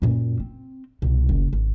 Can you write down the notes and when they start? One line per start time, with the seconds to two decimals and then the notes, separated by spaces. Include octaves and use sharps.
0.02 F#2 A#2
0.40 C4
1.02 C2 B2
1.29 F#1
1.53 G#1